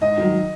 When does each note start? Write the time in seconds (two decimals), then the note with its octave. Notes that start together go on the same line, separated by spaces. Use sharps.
0.01 G#2 D#5
0.18 D#3 F#3